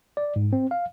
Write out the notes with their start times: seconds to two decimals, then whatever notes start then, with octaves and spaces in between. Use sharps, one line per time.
0.17 D5
0.36 G#2
0.53 C4
0.71 F5